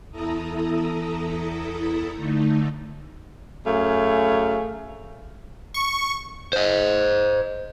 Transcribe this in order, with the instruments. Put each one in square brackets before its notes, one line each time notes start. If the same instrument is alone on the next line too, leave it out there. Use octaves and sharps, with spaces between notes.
[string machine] E2 E4 A4 A#5 D#6
D3 A3 D#4
[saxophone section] F#2 A3 G#4 F5
[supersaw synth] C#6
[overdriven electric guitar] C5 D#5